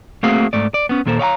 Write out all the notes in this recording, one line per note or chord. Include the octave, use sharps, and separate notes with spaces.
A3 A#3 C4 F#4 G#4 F5
G#2 A3 D5
D5
B3 C#4
D#2 A#2 A#3 A4 C5
C#5 F5 G5 A#5